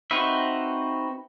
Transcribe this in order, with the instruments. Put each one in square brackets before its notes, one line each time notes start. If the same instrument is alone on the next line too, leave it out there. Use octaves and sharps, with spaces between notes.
[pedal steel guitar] C4 D#4 F#4 B4 E5